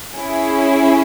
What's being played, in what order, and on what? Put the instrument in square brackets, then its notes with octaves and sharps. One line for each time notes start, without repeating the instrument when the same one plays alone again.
[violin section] C#4 E4 G#4